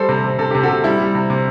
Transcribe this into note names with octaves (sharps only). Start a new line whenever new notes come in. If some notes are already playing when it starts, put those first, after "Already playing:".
Already playing: G3 A4 C5
C3
C3
C3 A4
C3 G4
F#4 A4
C3
G3 E4
G3
C3
C3